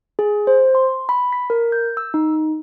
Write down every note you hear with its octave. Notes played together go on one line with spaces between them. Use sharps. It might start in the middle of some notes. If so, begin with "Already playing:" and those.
G#4
C5
C6
B5
B6
A#4
G6
E6
D#4